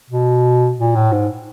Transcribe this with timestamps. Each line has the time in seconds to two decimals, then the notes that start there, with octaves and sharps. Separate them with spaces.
0.10 B2
0.78 A#2
0.95 A2
1.12 G#2